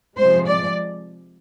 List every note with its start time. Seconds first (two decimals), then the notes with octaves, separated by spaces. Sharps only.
0.18 C3 F3 G#3 C5
0.48 D5